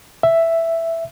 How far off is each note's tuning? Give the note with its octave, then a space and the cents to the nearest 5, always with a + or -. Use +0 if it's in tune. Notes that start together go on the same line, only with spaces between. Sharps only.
E5 +5